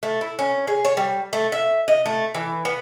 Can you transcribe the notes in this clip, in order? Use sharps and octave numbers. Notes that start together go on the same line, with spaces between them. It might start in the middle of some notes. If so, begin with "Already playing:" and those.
A3
E4
C#4
G#4
C#5
G3
A3
E5
D#5
A3
E3
B3